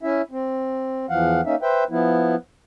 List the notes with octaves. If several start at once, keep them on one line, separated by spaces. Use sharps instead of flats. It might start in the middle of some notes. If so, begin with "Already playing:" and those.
C#4 E4 E5
C4
E2 E3 F3 F5 F#5
A#3 C#4 D#4 E5
B4 C5 E5 G5
F3 B3 E4